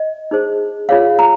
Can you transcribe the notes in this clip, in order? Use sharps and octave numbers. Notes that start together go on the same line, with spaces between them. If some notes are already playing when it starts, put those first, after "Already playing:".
Already playing: D#5
D#4 G#4 C5
F4 G#4 C#5 F5
A#5